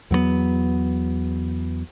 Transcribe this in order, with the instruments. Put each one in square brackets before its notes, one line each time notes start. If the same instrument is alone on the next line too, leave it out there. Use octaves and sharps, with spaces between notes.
[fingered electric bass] E2 F#3 G3 B3